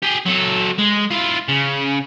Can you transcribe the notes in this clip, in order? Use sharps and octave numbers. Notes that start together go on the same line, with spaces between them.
G4 G#4
F#3 A4
G#3
E4 F4
C#3